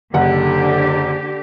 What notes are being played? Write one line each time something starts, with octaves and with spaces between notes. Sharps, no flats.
F#1 D3 G4 F#5